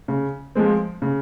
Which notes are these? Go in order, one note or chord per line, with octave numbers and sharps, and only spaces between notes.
C#3
F3 G#3 C4
C#3